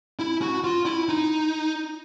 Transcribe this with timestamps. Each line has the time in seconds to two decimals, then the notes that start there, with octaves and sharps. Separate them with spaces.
0.19 E4
0.42 F#4
0.64 F4
0.85 E4
1.09 D#4